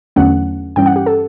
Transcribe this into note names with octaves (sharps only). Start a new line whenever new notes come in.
E2 D3 F#3 A3 C#4 F#5
G2 E3 G3 C#4 G5
F#5
G4
A4